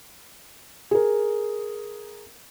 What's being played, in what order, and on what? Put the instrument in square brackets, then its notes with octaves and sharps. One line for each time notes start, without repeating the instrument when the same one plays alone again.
[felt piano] G#4 A#4